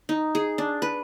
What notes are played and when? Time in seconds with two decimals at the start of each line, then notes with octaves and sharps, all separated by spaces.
0.09 D#4
0.35 G#4
0.58 D4
0.82 B4